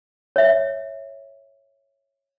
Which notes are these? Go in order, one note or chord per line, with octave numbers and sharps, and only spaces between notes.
C#5 E5